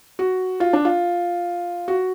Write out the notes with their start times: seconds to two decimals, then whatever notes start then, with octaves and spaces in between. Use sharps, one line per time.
0.19 F#4
0.60 F4
0.73 D4
0.85 F4
1.88 F#4